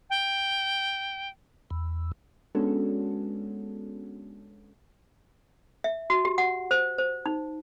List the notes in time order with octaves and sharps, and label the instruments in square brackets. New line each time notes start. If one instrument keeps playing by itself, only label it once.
[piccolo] G5
[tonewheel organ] E2
[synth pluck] G#3 B3 C#4 D4 F#4 A4
[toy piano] E5
F#4
G4
F#5
C5
C5
D#4